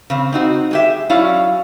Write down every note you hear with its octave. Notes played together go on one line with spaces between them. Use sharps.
C#3 C4
C4 D#4 F#4
G#3 G4 E5
F#3 C#4 E4 C#5 D5 F5